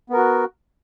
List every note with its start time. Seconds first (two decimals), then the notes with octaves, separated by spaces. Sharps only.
0.10 B3
0.13 A#4
0.17 F#4